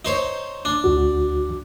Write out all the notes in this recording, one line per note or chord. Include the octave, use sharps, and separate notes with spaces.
D#4 C5 C#5
D4
D2 F#4